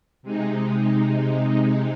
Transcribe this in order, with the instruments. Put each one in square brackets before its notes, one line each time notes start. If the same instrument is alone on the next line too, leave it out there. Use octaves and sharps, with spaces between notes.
[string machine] C3 G#3 D#4